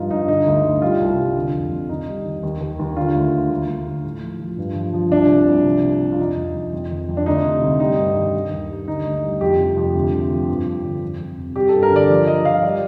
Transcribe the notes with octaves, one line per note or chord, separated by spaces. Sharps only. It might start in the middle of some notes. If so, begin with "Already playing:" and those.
Already playing: G2 F3 G3 D#4 F4
G2 D#4
D3 D#4
D2
D2
G3 F4
C2
C2
D3
F2
F2
D#3 D#4
G3
D#3
D#2
D#2
D#2
D3 F4
D2
D2
D2
D2
D2
A2
F3
F3
G2
F3
F3
C2 D4
C3
C2
F3
C3
C3
F4
F2 D#4
F2
F2
F2
D#3
F2
D4
D2 D#4
C3
D2
G3 D#4
G2
D#3
D#3
D#2
G3
D3 D#4
D2
G3
F2 G4
C3
F2
D2
D2
F3
G2
G2
D3
F2
F2
C3
G3 G4
A4
G2
A#4
D3 D5
F3
F3 D#5
F3 F5
G3 D5